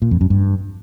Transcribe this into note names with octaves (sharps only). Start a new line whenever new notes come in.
A#2
F2
F#2
G2